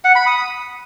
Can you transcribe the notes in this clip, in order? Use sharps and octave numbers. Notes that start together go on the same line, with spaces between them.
F#5
B5
D#6